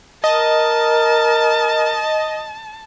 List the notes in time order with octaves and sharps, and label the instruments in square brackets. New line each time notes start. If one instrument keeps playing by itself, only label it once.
[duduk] A#4 [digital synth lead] D#5 [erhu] A5